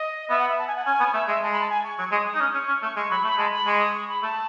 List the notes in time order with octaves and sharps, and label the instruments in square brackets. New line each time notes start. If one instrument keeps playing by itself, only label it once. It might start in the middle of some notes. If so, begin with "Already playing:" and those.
Already playing: [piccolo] D#5
[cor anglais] B3 [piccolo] E5
[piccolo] F#5
E5
A5
G#5
F#5
[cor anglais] C#4 [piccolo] G#5
[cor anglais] B3
[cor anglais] A3 [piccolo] E5
[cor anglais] G#3 [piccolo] E5
[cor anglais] G#3 [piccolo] A5
[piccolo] B5
A5
G#5
C#6
[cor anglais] F#3 [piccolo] C#6
[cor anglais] G#3 [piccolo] D#6
[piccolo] D#6
[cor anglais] D#4
C#4
[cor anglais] C#4 [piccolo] C#6
[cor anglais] C#4
[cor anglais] A3 [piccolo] C#6
[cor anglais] G#3 [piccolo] C#6
[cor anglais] F#3 [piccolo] B5
[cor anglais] A3 [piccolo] B5
[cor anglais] G#3 [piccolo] A5
[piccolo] B5
[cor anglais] G#3 [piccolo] C#6
[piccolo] D#6
C#6
B5
[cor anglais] A3 [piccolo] A5